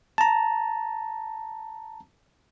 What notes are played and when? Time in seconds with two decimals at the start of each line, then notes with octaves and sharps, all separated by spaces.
0.18 A5 A#5